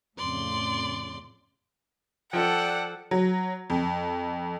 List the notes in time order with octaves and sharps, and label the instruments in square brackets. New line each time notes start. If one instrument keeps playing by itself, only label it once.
[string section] F2 A2 C#3 [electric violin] D5 C6
[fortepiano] F3 [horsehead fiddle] A4 [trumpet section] D5 G5 [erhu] F#5
[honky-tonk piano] F#3
F2